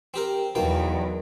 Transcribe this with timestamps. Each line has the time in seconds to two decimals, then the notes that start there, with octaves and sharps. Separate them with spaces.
0.14 C4 G4 A#4
0.55 E2 B2 D#3 F#3 A#3 G5